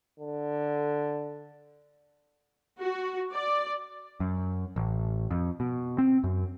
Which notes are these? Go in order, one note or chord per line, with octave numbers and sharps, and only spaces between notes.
D3
F#4
D5
F#2
A1
F2
B2
C4
F#2